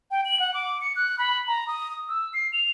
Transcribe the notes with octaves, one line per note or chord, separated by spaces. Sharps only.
G5
F#7
F#5
D6
C#7
F#6
B5
A#5
D#6
E6
C7
F7